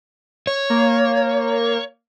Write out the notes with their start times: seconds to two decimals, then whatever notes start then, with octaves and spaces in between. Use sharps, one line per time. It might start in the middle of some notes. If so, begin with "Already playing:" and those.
0.47 C#5
0.70 A#3